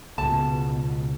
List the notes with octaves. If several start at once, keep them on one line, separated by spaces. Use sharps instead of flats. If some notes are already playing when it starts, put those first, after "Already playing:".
C#2 B2 G#3 A5